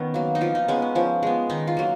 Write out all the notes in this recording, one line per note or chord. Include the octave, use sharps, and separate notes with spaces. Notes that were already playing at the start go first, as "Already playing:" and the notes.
Already playing: D#3 B3 C#4
F#3 A#3
D#4
F3 F4
D#4
G#3 B3 C#4
C#4
F3 C#4
G#3 B3
D#3 D#4
F4
F#3 A#3